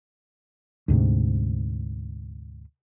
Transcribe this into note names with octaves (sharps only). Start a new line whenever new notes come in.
D2 G#2 C3